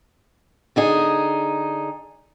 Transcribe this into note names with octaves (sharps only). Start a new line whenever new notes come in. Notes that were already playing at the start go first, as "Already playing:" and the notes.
D3 D#4 G#4